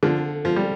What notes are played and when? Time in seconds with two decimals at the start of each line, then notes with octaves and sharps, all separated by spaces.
0.03 D3 F3
0.45 F3
0.56 G3